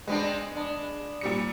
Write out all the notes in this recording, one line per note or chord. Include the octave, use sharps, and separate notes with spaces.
G#3 B3 C4 D4
B3 D4
A#2 G3 C#7